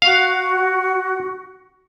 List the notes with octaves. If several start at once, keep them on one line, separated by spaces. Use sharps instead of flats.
F#4 F5